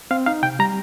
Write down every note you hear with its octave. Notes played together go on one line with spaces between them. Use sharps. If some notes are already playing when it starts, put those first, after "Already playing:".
C4 F5
D#4 F5
C3 G5
G3 A#5